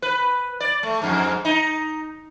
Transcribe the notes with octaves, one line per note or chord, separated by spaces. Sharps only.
B4
D5
A3
F2 G#2
D#4